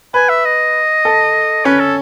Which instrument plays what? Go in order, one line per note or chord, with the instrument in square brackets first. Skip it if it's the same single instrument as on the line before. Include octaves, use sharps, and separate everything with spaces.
[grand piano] B4 [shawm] G#5
[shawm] E5
D#5
[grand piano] A4
[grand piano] C#4 [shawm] B4
[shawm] A4